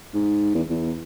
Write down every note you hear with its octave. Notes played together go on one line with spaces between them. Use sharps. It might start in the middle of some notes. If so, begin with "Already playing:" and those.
G#2
E2
E2